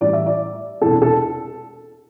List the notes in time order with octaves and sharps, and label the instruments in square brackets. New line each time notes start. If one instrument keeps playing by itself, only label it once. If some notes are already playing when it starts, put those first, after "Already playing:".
[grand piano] A1 A2 G3 D5
E5
D5
E1 E2 C3 A4
A4